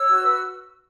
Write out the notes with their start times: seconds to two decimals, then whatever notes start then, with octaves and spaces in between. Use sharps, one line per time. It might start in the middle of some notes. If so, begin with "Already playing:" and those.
Already playing: C#5 E6
0.08 F#4
0.23 B4